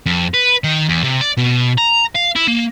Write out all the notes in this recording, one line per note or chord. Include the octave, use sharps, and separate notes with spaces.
F2
B4
D#3
E2
C3
D5
B2
A#5
F5
E4
A#3